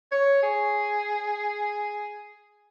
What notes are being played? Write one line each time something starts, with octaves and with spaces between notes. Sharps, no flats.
C#5
G#4